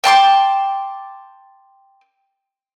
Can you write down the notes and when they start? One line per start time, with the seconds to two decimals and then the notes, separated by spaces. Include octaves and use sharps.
0.04 G5 A5 C6 D6